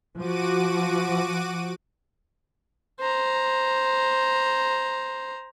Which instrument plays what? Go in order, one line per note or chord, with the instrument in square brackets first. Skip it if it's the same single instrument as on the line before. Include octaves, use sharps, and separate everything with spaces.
[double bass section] F3 [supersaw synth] F#4 D6 D#7
[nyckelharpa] C5 A#5